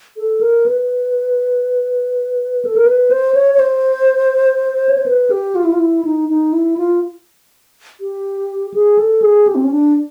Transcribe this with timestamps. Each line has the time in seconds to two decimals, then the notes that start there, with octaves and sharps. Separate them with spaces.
0.17 A4
0.41 A#4
0.66 B4
2.65 A4
2.76 A#4
2.86 B4
3.11 C5
3.34 C#5
3.54 C#5
3.59 C5
4.89 C#5
4.98 C5
5.06 B4
5.30 G4
5.55 F4
5.64 E4
5.72 F4
5.79 E4
6.05 D#4
6.29 D#4
6.53 E4
6.77 F4
8.00 G4
8.74 G#4
8.99 A4
9.22 G#4
9.47 G4
9.55 C4
9.64 C#4
9.71 D4